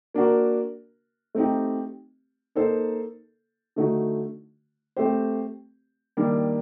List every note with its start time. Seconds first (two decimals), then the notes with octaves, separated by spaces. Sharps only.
0.14 A#3 D4 F#4 A#4
1.35 A3 C4 D#4 G4
2.55 A#3 D#4 A4 C5
3.76 D3 A3 D#4 F#4
4.97 A3 C4 G4 C5
6.17 D#3 G3 A#3 D4